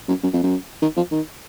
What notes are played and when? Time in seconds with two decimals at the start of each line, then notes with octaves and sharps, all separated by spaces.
0.09 F#2
0.23 F#2
0.34 F2
0.43 F#2
0.82 D#3
0.97 F3
1.11 D#3